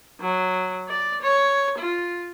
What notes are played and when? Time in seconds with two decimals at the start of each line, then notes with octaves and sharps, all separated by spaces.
0.21 F#3
0.88 D5
1.22 C#5
1.79 F4